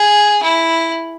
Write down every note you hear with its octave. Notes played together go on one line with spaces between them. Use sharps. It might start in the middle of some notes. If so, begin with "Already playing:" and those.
Already playing: G#4
E4